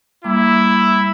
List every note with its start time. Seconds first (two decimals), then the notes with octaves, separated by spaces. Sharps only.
0.24 G3 A#3 E4 D6